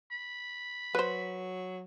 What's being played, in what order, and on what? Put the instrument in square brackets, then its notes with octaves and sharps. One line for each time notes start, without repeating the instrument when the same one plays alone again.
[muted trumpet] B5
[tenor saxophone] F#3 [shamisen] B4 C5